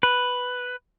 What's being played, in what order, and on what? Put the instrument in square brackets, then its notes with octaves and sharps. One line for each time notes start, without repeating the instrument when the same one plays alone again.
[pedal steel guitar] B4